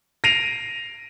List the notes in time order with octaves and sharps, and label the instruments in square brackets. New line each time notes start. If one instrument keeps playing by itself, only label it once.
[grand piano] A#6 C7 D7 D#7 F7